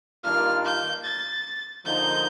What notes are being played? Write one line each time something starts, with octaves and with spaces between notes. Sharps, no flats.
G2 D#3 A#3 D4 F4 F6
G6
A6
D3 F3 A#3 D#4 G6